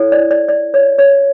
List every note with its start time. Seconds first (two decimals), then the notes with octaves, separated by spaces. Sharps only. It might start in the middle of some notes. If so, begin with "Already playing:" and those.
Already playing: E4 A4 C#5
0.12 D5
0.31 D5
0.49 D5
0.74 C#5
0.99 C#5